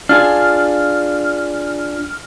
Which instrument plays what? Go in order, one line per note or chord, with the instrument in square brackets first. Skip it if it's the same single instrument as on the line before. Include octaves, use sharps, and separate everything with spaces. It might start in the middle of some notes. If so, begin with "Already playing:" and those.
[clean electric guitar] D4 F4 G#4 [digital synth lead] F6